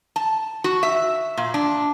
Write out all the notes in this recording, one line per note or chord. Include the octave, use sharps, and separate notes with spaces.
A5
F#4
E5
A#2
D4